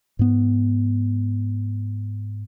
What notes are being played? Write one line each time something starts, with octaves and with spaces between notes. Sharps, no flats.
G#2 B3